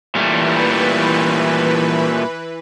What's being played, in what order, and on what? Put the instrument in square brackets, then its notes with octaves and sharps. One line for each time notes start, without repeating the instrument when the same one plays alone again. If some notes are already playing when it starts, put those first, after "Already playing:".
[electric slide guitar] A#2 G3 A3 [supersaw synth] E3 B4